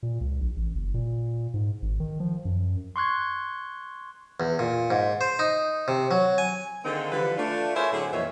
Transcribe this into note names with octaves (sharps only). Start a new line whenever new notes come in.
A#2
C#2
A#1
A1
F#1
A#2
G#2
G#1
D#3
F3
F#2
C6 C#6 F#6 G#6
E2
A#2
G#2
C5
D#4
C3
F#3
G#5
D3 D#3 A#3 C4 D#4 G#4
D3 E3 F3 G3 B4
A3 D4 F4
E4 G#4 A#4 C5 C#5 E5
A2 D3 F#3 C4 G#4
F2 A#2 D#3 E3 C#5 E5